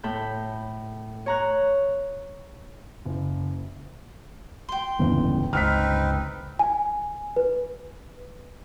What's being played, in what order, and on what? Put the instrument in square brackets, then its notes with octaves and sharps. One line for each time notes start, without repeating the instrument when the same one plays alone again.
[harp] A2 A4 B5 G6
C#5 A#5 F#6
[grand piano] F#1
[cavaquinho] G5 C6
[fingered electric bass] D1 C#3 E3 [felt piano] G1
[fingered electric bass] G1 C#2 [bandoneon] C4 D#4 B4 [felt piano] F6 B6
[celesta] G#5
B4